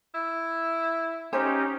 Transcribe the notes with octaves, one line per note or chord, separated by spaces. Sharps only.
E4
C#4 D#4 G4 C5 C#5 G#5